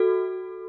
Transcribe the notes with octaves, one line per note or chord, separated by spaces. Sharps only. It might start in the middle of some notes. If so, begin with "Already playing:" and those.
Already playing: F#4 A4